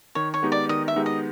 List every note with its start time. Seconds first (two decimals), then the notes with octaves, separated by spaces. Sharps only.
0.15 D#3 C#5
0.34 C#5
0.42 G#3 B3 D#4 G4
0.52 D5
0.69 D#3 D#5
0.88 E5
0.96 G#3 B3 D#4 G4
1.06 D#5